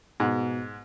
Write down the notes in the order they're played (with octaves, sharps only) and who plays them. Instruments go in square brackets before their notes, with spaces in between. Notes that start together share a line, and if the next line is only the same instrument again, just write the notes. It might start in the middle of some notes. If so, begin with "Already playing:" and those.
[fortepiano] G#2 [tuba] B2